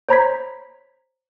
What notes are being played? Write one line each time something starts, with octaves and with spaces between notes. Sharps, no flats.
C5 C#5 A#5 B5 G#6 B6